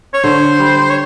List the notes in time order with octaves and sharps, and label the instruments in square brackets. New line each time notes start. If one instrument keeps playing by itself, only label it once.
[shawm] C#5
[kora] D3 [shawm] C5
[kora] G3
[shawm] C#5